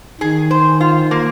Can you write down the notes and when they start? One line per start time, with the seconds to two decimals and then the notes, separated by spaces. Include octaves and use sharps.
0.21 D#3 G#4
0.51 C5
0.81 F4
1.11 A#3